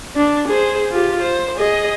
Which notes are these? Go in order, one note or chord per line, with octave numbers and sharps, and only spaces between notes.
D4
G#4 C5
F4 G4
C5
G#4 D#5